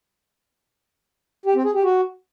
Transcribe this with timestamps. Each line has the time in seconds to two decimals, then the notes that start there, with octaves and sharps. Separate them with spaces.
1.46 G4
1.55 C4
1.65 G#4
1.74 G4
1.84 F#4